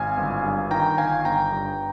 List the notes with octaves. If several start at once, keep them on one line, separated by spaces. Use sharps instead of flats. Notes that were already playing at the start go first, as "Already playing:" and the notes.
Already playing: G#1 F5 G#5
G1
G2
D#3 G5 A#5
G1 F5 G#5
G1 G5 A#5
G2